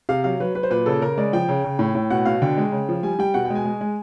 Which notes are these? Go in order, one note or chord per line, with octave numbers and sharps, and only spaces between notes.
C3 F5
F#3 F5
F#3 B4
F#3 B4
C5
A#2 B4
C#3 A4
C#3 A#4
G#3 D5
F3 G5
C#3
C#3
A2
A2
B2 F#5
B2 F5
D3 G5
G#3
C#3
F3
G3 G#5
G3 G5
B2 F#5
G5
G#3
G#5
G#3
G#3